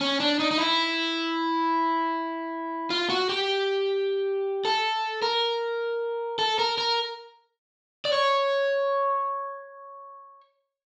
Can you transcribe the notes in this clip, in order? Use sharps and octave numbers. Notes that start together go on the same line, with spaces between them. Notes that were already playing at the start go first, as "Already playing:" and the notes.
C#4
D4
D#4
D#4
E4
F4
F#4
G4
A4
A#4
A4
A#4
A#4
D5
C#5